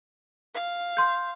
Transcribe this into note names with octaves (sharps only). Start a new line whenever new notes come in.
F5
C6 G6